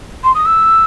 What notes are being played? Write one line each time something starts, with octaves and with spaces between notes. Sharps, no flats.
C6
D#6
E6